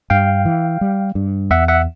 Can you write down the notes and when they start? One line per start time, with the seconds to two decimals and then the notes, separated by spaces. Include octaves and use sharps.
0.10 G2 F5 G5
0.45 E3
0.81 G3
1.15 G2
1.50 E2 E5 F#5
1.68 E5 F#5